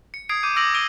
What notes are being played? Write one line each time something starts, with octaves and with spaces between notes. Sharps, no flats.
C#7
D#6 G#6 C7 D7
D6 G6 D#7
D6 E6 A#6 D7 F7 F#7
D#6 E6 D7 D#7 G7